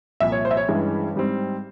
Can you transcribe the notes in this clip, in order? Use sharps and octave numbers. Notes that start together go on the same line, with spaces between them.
C2 A#2 F3 E5
C#5
C5
E5
C#5
G2 E3 G#3 C#4
G#2 G3 C4